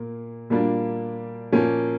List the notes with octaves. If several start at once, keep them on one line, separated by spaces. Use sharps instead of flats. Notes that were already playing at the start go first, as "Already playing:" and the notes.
Already playing: A#2 A#3
A#2 G3 A#3 D4 F4
A#2 F3 A#3 C#4